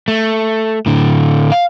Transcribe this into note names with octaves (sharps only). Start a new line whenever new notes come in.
A3
A2 D3
F5